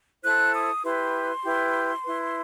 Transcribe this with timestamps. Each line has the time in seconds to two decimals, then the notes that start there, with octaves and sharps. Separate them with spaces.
0.23 E4 A4 C5 F#6
0.53 D#6
0.83 E4 G4 B4 C6
1.44 E4 G4 B4
2.04 E4 B4